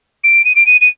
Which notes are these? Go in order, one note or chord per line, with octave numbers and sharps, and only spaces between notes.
D7
D#7
D7
D#7
D#7